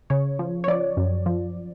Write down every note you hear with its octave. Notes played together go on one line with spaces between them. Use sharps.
C#3 C#5
F3
C#5
F3 D5
F#2
F3